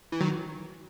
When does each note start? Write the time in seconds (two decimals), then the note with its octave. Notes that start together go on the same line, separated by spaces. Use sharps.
0.12 E3
0.21 D#3 F#3